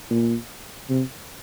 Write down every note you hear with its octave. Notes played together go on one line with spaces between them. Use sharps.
A#2
C3